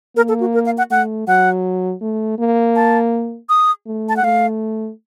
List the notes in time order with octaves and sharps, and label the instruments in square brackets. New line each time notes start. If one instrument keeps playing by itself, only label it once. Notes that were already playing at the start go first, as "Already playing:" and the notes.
[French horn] A#3 [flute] A#4
[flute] A4
F#4
A#4
F5
F#5
[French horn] A3 [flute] F#5
[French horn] F#3 [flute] F#5
[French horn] A3
A#3
[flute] A5
D#6
[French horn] A3
[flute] A5
F#5
[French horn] A3 [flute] F5